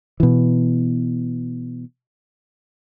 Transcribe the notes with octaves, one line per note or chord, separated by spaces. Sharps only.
B2 E3